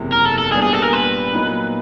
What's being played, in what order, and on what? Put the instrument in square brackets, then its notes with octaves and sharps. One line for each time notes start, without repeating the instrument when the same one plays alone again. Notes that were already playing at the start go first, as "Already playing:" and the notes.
Already playing: [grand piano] F#1 E2 C3
[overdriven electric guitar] A#4
A4
A4
[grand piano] A#2 G3 B3 D4 [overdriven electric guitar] G#4
[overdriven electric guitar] G#4
A4
A#4
B4
[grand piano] A#2 F#3 B3 D#4